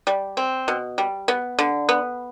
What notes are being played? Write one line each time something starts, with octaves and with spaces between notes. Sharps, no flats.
G3
C4
B2
G3
B3
D3
B3